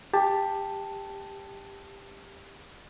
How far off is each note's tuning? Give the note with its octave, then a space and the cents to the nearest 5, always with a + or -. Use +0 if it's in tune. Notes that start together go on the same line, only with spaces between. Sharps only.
G4 +15 A5 +0